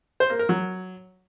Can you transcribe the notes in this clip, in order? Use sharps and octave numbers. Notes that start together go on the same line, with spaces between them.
C5
A#3
A#4
F#3